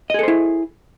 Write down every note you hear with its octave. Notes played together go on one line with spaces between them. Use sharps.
E4 G#4 A4 C5 D#5